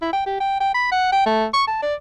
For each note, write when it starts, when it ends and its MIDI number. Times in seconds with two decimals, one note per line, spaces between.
0.02 0.12 64
0.13 0.22 79
0.26 0.37 67
0.40 0.59 79
0.60 0.70 79
0.74 0.91 83
0.92 1.09 78
1.12 1.26 79
1.26 1.45 57
1.54 1.65 85
1.68 1.81 81
1.82 1.94 74